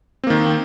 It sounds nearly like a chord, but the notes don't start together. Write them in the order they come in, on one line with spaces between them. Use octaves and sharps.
C4 A#3 D#3